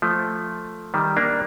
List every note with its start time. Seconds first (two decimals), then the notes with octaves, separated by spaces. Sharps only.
0.02 F3 A3
0.94 D#3 G3
1.17 A#3 D4